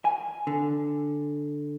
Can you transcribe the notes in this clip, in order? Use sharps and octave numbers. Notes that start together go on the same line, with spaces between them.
G#5
D3